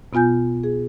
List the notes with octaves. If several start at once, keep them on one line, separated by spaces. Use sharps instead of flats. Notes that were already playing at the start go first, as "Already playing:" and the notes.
B2 B3 F4 G#5 G6
G#4